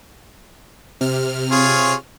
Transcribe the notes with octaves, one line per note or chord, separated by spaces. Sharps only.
C3 F6
F4 G#4 C#5